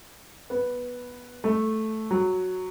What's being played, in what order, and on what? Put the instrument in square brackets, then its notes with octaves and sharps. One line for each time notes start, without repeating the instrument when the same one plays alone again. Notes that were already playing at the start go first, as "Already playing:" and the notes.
[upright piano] B3
A3
F#3